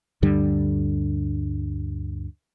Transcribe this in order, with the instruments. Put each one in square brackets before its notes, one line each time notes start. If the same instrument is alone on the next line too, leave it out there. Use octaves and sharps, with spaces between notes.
[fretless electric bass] D2 G2 D3 G3